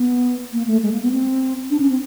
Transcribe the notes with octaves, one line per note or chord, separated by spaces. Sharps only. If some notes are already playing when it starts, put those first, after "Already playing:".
Already playing: B3
A#3
A3
G#3
A#3
B3
C4
D4
C#4
C4